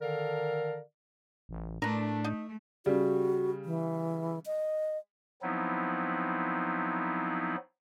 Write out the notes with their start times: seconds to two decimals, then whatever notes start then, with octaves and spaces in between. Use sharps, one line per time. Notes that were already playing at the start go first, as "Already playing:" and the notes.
0.01 D3 D#3 A4 A#4 D5 F5
1.49 A1
1.82 A2 A3 D4 A#4 B4
2.24 A3 D#4
2.86 C#3 G3 F#4
3.65 E3
4.46 D#5
5.42 F3 F#3 B3 C4 D#4 E4